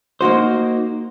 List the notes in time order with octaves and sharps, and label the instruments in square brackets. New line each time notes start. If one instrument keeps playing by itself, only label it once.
[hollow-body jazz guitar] A#3 D#4 F#4 C5